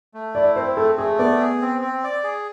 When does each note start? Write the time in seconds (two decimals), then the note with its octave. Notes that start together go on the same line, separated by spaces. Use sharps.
0.14 A3
0.35 E4 D5
0.56 C4 C5
0.77 A3 A4
0.98 A3 G#4
1.19 B3 D5
1.40 G#4
1.62 C4
1.81 C4
2.04 D5
2.24 G#4